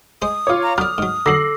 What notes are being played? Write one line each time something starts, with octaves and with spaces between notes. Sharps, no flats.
G#3 C5 D#6
F4 C#5 D6
A#5
F#3 D5 D#6 F6
G#2 F#3
D3 F#3 A4 D6 E6 A#6 C7 F#7